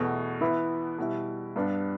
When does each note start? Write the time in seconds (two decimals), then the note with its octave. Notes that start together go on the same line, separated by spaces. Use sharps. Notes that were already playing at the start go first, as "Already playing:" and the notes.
Already playing: E2 B2 A3
0.41 E3 B3 E4 B4
0.98 B2 G3 E4
1.56 G2 G3 B3 D4